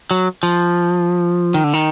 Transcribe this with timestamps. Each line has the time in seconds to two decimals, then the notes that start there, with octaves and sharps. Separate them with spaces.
0.11 F#3
0.43 F3
1.54 D#3
1.64 D3
1.73 D#3